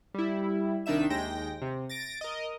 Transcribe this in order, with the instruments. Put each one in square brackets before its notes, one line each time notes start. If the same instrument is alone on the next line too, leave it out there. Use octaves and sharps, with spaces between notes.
[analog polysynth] G3 E4
C2 D#3 D4 D#4 E5 E7
D#2 G#3 G5 A#6
C3
A6 A#6 D7
A#4 D#5